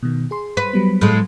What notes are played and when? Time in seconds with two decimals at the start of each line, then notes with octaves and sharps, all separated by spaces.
0.03 B2 D#3
0.31 G#4 C6
0.57 B4
0.73 F#3 G3 B3
1.01 A2 G#3